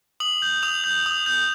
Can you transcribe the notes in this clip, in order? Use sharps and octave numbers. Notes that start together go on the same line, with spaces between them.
D#6 F#7
G6
D#6 F7
G6
D#6
G6